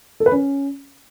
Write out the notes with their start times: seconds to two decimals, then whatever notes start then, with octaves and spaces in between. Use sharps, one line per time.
0.20 A4
0.26 B4
0.32 C#4